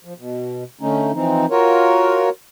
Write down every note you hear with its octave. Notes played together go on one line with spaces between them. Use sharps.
F3
B2
D3 A3 C#4 D#4
E3 F3 C4 D#4
F4 F#4 A#4 C#5